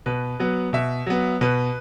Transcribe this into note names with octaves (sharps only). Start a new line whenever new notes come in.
B2 B4
F#3 B3
B2 E5
F#3 B3
B2 B4